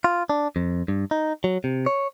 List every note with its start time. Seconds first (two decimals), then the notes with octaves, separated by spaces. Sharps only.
0.04 F4
0.30 D4
0.56 F2
0.88 G2
1.11 D#4
1.44 F#3
1.64 C3
1.86 C#5